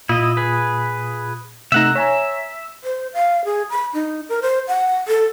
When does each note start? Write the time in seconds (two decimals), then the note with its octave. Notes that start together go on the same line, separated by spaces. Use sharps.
0.09 A#2 E4 F4 D#5 D#6
0.37 G#4 B4
1.72 C3 A3 D#4 E5 F#5 A#5
1.95 C#5 E5 G#5 A#5
2.84 C5
3.14 F5
3.45 G#4
3.70 B5
3.94 D#4
4.29 A#4
4.42 C5
4.68 F#5
5.08 A4